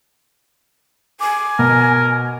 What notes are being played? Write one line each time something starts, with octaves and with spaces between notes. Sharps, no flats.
G#5 D6
B2 A#4